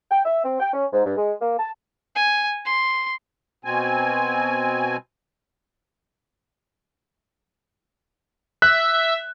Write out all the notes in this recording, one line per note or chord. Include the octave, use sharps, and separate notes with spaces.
G5
E5
C4
G5
C#4
G#2
G2
G#3
A#3
A5
G#5
C6
B2 C4 G#5
E5 F#6